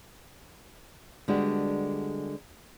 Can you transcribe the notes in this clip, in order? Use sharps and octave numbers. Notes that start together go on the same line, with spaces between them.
D3 G3 G#3 B3 D4 F#4